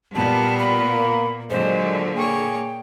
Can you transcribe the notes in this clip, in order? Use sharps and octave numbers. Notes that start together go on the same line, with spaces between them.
A#2 G3 B3 A#4 A5
B5
A#3
A#2 D3 F#3 G#3 C5
A#3 G#4 C#5 G5